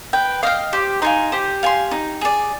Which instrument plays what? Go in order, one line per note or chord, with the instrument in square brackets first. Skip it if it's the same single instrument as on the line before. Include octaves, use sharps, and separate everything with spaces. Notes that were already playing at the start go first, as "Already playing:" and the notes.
[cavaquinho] B4 [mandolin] G5
[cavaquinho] D#5 G5 [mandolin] F5
[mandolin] G4 [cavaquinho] C5
[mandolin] D#4 [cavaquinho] F5 G#5 C6
[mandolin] G4 [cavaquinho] C5
[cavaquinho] F5 G#5 C6
D#4
G#4 D5